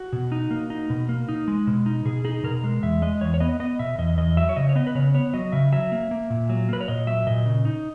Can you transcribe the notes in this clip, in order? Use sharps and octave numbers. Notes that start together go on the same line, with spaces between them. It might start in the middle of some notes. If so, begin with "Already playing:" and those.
Already playing: F#4
B2
D#4
A#3
D#4
B2
A#3
D#4
G#3
B2
D#4
B2 G#4
D#4 G#4
B2 A#4
G#3
E2 E5
G#3 D#5
E2 C#5
C#5
B3 D#5
B3 D#5
B2 E5
E2 D#5
E2 D#5
F#3 E5
C#5
C#3 D#5
C#5
B3 D#5
B4
C#3 C#5
B3 C#5
F#3 D#5
C#3 E5
F#3 E5
A#3
A#3
A#2
F#3
A#3 B4
C#5
A#2 D#5
F#3 E5
A#2 D#5
C#3
D#4